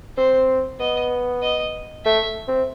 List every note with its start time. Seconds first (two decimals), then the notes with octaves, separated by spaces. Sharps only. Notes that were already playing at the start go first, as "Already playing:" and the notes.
0.17 C4 C5
0.80 B3 D#5
1.43 D#5
2.05 A3 E5
2.48 C4